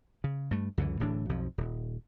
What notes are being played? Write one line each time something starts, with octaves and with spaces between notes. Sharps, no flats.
C#3
G2 A3
C#2 F#2 D3 E3
D1 A2 E3 D4
B1 F2 F3
D#1